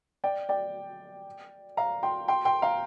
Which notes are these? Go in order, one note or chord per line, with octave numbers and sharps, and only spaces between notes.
D5 G5
D5 G5
F5 A#5
G5 C6
G5 C6
G5 C6
F5 A#5